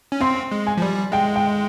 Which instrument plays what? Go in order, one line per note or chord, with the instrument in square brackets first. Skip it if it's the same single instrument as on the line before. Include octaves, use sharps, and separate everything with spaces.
[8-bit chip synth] C#4
[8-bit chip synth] C4 [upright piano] C6
[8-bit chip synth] G#3
[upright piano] G#5
[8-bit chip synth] F3
G3
[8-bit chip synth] G#3 [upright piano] G5
[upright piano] G5